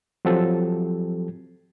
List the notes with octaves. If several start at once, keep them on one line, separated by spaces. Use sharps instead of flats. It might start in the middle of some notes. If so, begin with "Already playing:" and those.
F3 F#3 C4 G4 A4